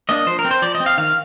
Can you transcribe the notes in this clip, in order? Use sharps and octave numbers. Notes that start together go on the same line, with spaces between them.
A#3 D4 D#5
F3 C5
A#4
C4
C5
F3 D5
D#5
C4
F5
D#3 F5